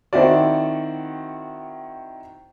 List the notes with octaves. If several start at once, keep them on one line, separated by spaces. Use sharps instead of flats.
D#3 C4 E4 F#4 D5